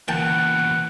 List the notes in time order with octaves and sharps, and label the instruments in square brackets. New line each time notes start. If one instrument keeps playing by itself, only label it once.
[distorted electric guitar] C#2 B2 [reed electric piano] E3 A#3 [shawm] F#5 [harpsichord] G5 A5